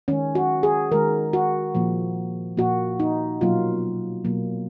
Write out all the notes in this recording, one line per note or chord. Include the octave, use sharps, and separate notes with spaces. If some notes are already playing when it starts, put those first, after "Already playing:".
D#3 G#3 C#4
F#4
G#4
D#3 G#3 A#4
F#4
A#2 F3 A#3
A#2 F3 A#3 F#4
D#4
B2 F#3 A#3 F4
B2 F#3 A#3